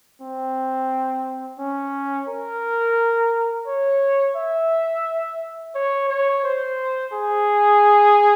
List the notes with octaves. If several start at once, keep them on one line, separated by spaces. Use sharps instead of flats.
C4
C#4
A#4
C#5
E5
C#5
C#5
C5
G#4